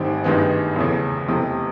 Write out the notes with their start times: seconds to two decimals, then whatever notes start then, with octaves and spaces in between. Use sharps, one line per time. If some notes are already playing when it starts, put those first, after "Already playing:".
Already playing: A1 G#2 D#3 G3 C4
0.24 A1 G2 D#3 G#3 B3
0.76 F1 E2 C#3
1.28 F1 E2 C3